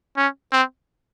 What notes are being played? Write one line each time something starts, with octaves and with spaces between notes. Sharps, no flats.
C#4
C4